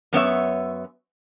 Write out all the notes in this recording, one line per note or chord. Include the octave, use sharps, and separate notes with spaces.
F#2 B3 C#5 E5